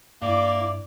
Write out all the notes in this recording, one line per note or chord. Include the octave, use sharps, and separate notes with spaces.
G2 A#3 E4 D5 D6